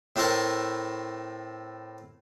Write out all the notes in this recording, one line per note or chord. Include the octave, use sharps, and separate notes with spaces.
A2 A3 C4 E4 A#4 A5